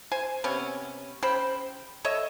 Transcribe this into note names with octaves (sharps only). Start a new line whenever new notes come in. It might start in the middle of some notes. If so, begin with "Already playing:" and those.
C5 G#5
C3 B3 C#4
C#3 C5 G5 B5
A4 C#5 D#5 E5